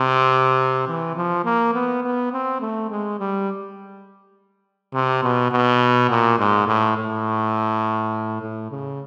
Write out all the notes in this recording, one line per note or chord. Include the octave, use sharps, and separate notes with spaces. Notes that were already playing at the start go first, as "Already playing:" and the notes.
Already playing: C3
E3
F3
A#3
B3
B3
C4
A3
G#3
G3
C3
B2
B2
A#2
G#2
A2
A2
A2
C#3